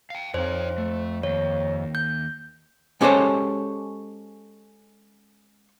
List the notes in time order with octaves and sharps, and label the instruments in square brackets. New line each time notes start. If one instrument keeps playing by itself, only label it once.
[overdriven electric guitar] F5 G5
[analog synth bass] F2 [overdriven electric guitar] D#4 C#5 [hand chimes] C5
[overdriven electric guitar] A3
[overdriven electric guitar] D#2 [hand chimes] C#5
[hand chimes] G6
[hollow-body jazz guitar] G#3 C#4 G4 A4 C5 C#5